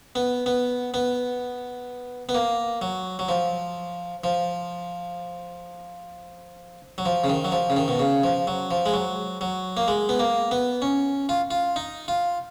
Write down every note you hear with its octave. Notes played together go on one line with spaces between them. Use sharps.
B3
B3
B3
B3
A#3
F#3
F#3
F3
F3
F#3
F3
C#3
D#3
F#3
F3
C#3
D#3
B2
C#3
F3
F#3
F3
G#3
F#3
F#3
A#3
G#3
B3
A#3
B3
C#4
F4
F4
D#4
F4